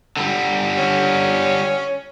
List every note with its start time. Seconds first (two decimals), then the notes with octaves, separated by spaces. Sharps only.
0.17 D3 G3
0.77 C#4